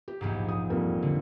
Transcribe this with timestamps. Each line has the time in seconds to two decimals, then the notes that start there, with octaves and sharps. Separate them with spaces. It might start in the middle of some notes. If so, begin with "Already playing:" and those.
0.08 G4
0.21 A#1 E2 G#2
0.49 D#6
0.70 F2 G3 A#3
1.02 D3